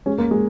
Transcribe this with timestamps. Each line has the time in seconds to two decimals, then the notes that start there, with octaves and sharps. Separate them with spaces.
0.06 G#3 C#4
0.18 A#3
0.31 G#3